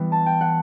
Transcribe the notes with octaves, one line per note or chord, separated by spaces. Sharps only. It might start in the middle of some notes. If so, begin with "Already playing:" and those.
Already playing: E3 G3 B3
A5
G5
F#5